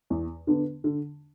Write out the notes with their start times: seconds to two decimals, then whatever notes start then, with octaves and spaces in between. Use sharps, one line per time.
0.10 E2
0.47 D3 B3 D4
0.84 D3